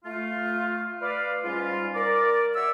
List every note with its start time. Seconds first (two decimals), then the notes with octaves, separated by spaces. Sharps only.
0.04 A3 F4
1.00 B4 D5 F5
1.43 G#2 G3 C#4 F4
1.94 A#4 D5
2.54 F#4 C#5 D5 E5 D6 E6